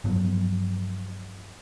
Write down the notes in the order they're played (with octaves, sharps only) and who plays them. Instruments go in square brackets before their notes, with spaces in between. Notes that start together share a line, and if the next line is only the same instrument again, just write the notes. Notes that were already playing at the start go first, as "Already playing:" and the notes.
[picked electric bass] G2 F3 F#3 B3